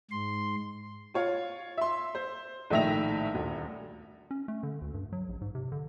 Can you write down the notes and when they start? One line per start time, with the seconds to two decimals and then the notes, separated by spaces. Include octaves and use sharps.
0.11 G#2 C6
1.14 F4 C#5 F5
1.78 E5 C6
2.15 C5
2.70 A#1 A2 D#3 E5 A#6 F7
3.33 D#1 D2
4.31 C#4
4.48 A3
4.63 D3
4.82 D2
4.94 G2
5.13 F#3
5.29 A#1
5.41 G#2
5.55 C3
5.72 D3